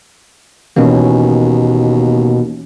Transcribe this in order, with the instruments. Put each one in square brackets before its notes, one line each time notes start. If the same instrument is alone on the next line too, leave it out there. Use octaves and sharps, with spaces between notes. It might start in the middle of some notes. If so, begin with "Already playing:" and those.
[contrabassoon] D#2 [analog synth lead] B2 [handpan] E3 C#4 [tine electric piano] A#3